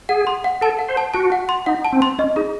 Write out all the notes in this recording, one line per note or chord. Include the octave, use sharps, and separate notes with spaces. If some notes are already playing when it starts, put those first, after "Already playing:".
G#4 F#5
C6
F#5
A4 A5
F#5
C5
A5
F#4 A5
F#5
C6
D#4 F#5
A5
C4
C6
C#4 D#5
D#4 G#4